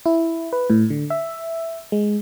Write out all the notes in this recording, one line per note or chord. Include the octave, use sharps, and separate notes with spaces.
E4
B4
A2
D3
E5
G#3